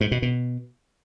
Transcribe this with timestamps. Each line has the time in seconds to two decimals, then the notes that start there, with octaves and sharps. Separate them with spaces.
0.01 G#2
0.11 B2
0.22 B2